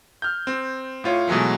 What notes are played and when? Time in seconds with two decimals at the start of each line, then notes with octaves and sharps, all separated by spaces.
0.22 F6 G6
0.47 C4
1.04 A2 F4 C#5
1.28 B2 E3 F#3 G#3 A3